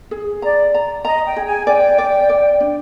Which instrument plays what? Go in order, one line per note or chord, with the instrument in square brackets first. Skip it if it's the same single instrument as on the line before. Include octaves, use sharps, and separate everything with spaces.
[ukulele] G#4
[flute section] D5 [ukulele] A#5
[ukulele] A#5
[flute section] D#5 [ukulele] A#5
[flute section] G5
[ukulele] G#4
[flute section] G#5
[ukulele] D5 [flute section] G5
[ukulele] D5
D5
D4